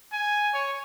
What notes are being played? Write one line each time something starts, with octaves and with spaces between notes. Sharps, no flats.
G#5
C#5